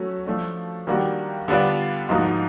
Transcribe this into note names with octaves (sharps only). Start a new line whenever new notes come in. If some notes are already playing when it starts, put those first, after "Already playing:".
Already playing: F#3 A3 C#4 F#4
F3 A3 D4
D#3 G3 A#3 D4 F#4
D3 G3 B3 D4 F4
G#2 F3 A#3 D#4 F#4